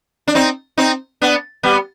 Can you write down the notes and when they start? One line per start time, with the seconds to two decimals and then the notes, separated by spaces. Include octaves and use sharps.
0.28 D4
0.35 C4 D#4
0.78 C4 D#4
1.21 B3 D4
1.63 G3 B3